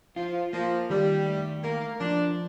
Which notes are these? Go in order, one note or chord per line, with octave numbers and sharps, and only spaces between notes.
F3 F4
F3 A#3
D#3 G3
A3
A#3 A#4
F3 D4